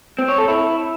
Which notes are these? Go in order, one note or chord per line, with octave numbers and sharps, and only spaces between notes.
C4
C#5
A4
E4